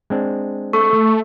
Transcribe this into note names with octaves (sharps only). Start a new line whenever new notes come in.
G#3 C4 D4
A3 A4 C#6